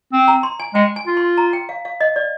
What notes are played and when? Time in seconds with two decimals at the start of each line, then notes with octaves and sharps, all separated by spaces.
0.13 C4
0.28 A#5
0.43 C6
0.60 G#5
0.74 G#3 G5
0.96 G#5
1.07 F4
1.17 C6
1.38 A#5
1.53 G5
1.69 F5
1.85 F5
2.00 D#5
2.16 D5